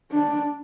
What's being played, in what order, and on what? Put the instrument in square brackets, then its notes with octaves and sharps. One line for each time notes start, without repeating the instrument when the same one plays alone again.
[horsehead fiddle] D4